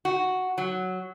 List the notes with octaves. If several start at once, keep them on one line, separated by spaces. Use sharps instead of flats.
F#4
F#3